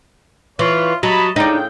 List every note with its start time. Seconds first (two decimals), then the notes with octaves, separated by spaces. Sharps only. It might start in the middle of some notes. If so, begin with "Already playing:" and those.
0.59 E3 F4 C#5
1.03 F#3 D#5 A5 B5
1.36 A2 C#3 D4 D#4 G5